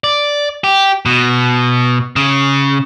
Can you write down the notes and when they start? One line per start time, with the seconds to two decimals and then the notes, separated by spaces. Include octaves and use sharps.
0.04 D5
0.64 G4
1.06 B2
2.16 C#3